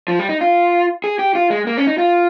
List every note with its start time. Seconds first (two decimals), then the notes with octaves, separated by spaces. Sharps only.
0.08 F3
0.19 G3
0.29 D#4
0.41 F4
1.04 G#4
1.19 G4
1.35 F4
1.50 G#3
1.67 A#3
1.78 C#4
1.87 D#4
1.98 F4